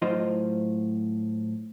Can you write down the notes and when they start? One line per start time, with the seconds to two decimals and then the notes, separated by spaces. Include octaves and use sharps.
0.02 A2 F#3 F4 C5 D#5